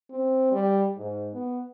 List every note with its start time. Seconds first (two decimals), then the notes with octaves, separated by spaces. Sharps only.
0.11 C4
0.52 G3
0.97 G#2
1.33 B3